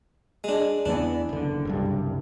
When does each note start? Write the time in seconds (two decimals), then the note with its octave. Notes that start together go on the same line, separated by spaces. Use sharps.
0.44 G#3 D4
0.86 E2 E3 B3 D4
1.29 F#1 D3
1.65 F#1 C2 G2